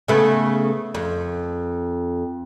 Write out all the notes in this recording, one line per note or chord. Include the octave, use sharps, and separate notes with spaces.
C#3 A3 B3
F2